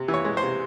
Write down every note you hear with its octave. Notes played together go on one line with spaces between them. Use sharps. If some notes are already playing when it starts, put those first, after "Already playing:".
Already playing: C3
E3
C#5
G#3
C5
C3